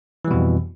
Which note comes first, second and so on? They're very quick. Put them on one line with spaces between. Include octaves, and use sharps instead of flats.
E3 G3 B2 F2